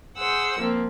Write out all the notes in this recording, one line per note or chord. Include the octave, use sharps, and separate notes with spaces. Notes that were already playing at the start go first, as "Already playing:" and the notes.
G#4 C5 F#5 E6
F3 A#3 C4